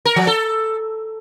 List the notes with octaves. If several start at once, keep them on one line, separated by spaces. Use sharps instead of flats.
A#4
F3
A4